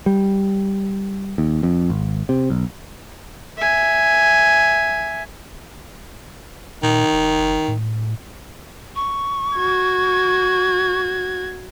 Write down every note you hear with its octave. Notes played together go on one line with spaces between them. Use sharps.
G3
D#2
F2
G#1
C3
B1
E5 G#5
A#2 D#3
E1
F#1
A2
C#6
F#4 G#6